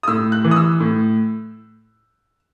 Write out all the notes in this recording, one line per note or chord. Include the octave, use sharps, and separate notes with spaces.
D#6
A2 E6
F#6
E3
D#6
E6
A2